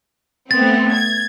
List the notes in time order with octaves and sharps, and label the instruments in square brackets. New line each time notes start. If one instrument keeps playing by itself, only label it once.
[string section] A3 B3 C4 [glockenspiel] A6
[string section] G#6